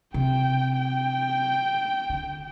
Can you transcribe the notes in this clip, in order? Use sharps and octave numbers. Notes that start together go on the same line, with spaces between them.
C3 G5
G5
D3